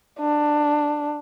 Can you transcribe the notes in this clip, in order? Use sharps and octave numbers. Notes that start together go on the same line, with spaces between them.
D4